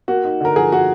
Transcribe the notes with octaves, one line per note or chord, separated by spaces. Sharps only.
A#3 F#4
D#4
D3 A#4
F3 G#4
A#3 F#4